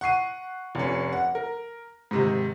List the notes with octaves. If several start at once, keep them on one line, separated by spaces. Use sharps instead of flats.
F#5 C#6 C7 D#7
F1 C#4
F#5
A#4
G#2 C3 D#3